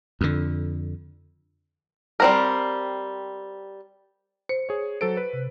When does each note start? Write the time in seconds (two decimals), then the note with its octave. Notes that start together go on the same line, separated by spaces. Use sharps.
0.21 F2 D3
2.20 G3 C4 A#4
4.49 C5 C#7
4.69 G#4 C#5
5.01 F#3 A4 C5 D7
5.17 B4
5.33 C3